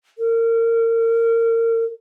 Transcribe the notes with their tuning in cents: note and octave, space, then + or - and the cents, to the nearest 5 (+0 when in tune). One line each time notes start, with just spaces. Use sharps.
A#4 -30